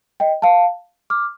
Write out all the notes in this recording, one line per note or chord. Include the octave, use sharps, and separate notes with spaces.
D#5 G5
F5 A5
D6 F6